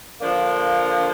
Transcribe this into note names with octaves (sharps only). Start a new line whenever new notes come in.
D3 F3 A#3 D4